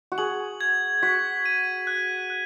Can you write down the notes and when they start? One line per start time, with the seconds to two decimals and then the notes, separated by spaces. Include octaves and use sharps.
0.12 F#4
0.18 G#4 F#7
0.61 G#6
1.03 F#4 B6
1.46 D#7
1.87 F#6
2.30 F#6